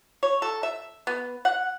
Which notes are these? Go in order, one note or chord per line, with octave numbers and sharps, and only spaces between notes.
C#5
A4
E5
B3
F#5